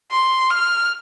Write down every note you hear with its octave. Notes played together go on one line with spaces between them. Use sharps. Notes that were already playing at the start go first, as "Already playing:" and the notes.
C6
F6